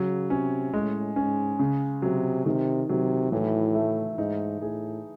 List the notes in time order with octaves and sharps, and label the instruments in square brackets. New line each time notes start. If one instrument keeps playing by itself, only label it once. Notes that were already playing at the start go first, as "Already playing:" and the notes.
Already playing: [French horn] C#3 [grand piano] F#3
[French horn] C3 [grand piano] C#4
[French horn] A2 [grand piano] G#3
[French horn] G#2 [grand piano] C#4
[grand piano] C#3
[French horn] C3 [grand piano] F#3
[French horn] C3 [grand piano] D#3
[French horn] C3 [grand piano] F#3
[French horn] A2 [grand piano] E3
[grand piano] A3
[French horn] G#2 [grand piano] D#4
[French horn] A2 [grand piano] G#4